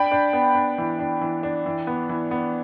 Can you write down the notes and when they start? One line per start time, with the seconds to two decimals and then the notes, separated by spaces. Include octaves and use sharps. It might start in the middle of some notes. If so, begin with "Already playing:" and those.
Already playing: D4 G5 B5
0.11 D4
0.33 B3
0.55 D4
0.78 E3
0.99 D4
1.21 E3
1.43 D4
1.66 E3
1.87 B3
2.09 E3
2.31 B3